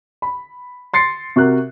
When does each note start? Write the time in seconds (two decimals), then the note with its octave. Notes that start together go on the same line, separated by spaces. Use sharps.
0.22 B5
0.94 C6 A6 C7 C#7
1.36 C3 F#4 A#4 F#6